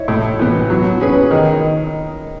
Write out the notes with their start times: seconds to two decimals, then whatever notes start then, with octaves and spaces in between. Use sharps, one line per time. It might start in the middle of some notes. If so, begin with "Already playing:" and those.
Already playing: E4 C#5 D#5 E5
0.08 A2
0.39 E3 B3
0.70 F#3
1.00 C#4 G#4 B4
1.31 D#3 D#5